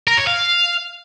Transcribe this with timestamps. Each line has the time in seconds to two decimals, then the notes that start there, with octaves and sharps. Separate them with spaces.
0.07 A#4
0.17 C#5
0.27 F5